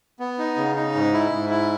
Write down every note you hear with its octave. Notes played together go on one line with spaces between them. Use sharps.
B3
D#4
C#3
D#4
G#2
E4
G#2
E4